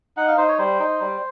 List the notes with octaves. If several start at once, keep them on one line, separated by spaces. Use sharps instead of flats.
D#4 F#5
F5
D#4 C5
C#5
G3 C5
D#4
G3